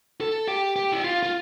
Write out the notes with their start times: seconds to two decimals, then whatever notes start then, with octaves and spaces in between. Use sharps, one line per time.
0.21 A4
0.48 G4
0.76 G4
0.92 E4
1.04 F4
1.23 F4